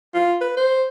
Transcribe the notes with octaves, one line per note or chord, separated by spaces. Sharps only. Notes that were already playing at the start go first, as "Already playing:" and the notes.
F4
B4
C5